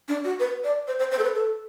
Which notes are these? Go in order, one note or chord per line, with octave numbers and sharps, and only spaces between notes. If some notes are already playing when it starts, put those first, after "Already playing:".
D4
F#4
B4
D5
C5
C5
C5
A4
B4
A4